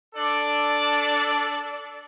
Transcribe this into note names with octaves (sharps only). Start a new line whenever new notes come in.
D4 A4 D5